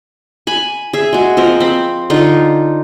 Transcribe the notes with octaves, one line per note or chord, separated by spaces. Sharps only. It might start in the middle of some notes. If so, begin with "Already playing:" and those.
G#5 B5
G#4 E5
G#3 F#4
F3 C4 A#4
C4 B5
D3 D#4 F4